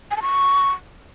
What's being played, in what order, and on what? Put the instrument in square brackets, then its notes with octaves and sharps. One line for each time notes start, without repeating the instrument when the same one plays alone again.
[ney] G#5
A5
C#6